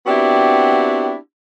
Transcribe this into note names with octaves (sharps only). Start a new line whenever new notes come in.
B3 C4 D4 E4 F#4 G4